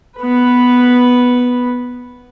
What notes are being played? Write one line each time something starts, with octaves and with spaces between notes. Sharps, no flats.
B3 B4